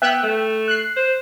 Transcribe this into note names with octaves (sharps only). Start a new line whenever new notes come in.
B3 E5 G5 F#6
A3
F#6 C7
C5